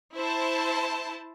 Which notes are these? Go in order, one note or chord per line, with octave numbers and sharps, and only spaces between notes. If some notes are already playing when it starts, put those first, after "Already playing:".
E4 C5 A5